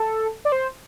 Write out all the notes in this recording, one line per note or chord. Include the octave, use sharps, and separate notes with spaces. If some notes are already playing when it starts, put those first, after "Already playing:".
Already playing: A4
D5
C5